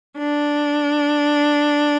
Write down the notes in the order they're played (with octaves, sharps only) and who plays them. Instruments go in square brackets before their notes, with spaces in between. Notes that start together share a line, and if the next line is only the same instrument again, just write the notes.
[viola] D4